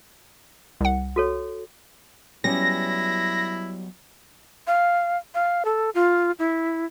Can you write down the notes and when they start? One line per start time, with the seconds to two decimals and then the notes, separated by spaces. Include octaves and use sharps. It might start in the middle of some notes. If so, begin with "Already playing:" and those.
0.81 C2 F#5
1.16 F#4 A4 C#5
2.44 F#3 G3 B3 C#4 E4 A#6
4.67 F5
5.34 F5
5.65 A4
5.95 F4
6.39 E4